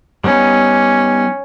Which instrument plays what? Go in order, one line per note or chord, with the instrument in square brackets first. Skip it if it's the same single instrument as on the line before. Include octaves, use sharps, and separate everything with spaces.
[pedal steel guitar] G3 B3 D#4 [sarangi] C#4